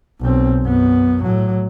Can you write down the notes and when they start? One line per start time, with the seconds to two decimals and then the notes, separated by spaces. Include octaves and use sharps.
0.21 B1 C4
0.62 F#2 B3
1.23 A2 F#3